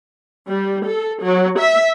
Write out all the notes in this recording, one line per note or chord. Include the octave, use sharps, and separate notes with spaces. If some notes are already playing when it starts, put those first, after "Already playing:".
G3
A4
F#3
E5